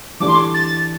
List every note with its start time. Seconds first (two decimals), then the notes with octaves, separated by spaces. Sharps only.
0.20 E3 A3 D4 G4 D5 D6
0.28 C6
0.35 D6
0.54 A6